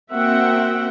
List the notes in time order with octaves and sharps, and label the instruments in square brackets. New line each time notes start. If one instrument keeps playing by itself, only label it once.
[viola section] A#3 C4 F#4 E5 F#5 G5